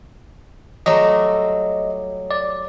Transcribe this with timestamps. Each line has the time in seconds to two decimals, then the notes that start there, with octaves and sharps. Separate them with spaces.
0.86 F#3 G3 A3 D#5
2.31 D5